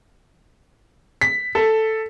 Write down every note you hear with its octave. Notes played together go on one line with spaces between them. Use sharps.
B6
A4